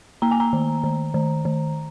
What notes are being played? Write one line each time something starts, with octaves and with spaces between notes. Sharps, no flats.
A#3 A#5
G#5
A#5
D#3
D#3
D#3
D#3